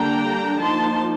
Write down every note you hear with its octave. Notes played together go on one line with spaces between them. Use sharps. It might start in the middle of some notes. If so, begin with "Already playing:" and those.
Already playing: D3 G3 A#3 D4 G5 A#5
F3 A#3 D#4 A5 C6